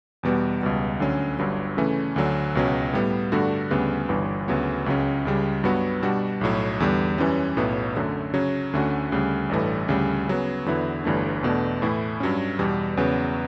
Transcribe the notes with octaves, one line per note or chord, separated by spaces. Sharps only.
E2 B2 G3 B3
C#2 B2 G3
D2 D3 F#3 C#4
G1 G2 F#3
C#3 E3 A3 C#4
D2 D3 F#3
C#2 B2 F#3 C#4
A2 G3 B3
G2 D3 A3 D4 F#4
D2 C#3 G3 B3
G1 G2 E3
D2 C#3 F#3 B3
C#2 C#3 F#3 C#4
C#2 C#3 G3
G2 F#3 B3 F#4
B2 G3 D4 F#4
B1 A2 F#3
E2 D3 G3
F#2 E3 G3 C#4
B1 A2 F#3 B3
F#2 D3 F#3 A3
C#3 F#3 C#4
D2 D3 A3 C#4 F#4
D2 C#3 G3
A1 G2 E3 A3
D2 C#3 G3
C#3 F#3 B3
E2 D3 F#3 B3 E4
G1 G2 E3 A3 D4
E2 B2 A3 D4
A2 E3 A3 E4
G2 F#3 C#4
E2 B2 G3
E2 C#3 F#3 B3